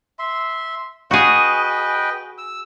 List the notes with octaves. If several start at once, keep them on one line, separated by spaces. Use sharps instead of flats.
E5 C6
F#4 G#4 B4 D#5 G5
E6